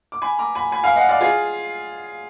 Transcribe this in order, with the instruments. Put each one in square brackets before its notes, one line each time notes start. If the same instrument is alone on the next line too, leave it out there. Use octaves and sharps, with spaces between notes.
[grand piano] D6
G#5 B5
A#5 D6
G#5 B5
G#5 B5
F5 G#5
D#5 F#5
D5 F5
F4 G#4